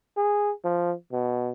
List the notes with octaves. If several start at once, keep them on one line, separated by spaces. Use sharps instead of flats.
G#4
F3
B2